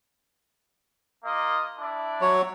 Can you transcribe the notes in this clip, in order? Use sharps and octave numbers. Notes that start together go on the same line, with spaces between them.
A#3 F4 D#5
D4 E4 D5
F#3 C#5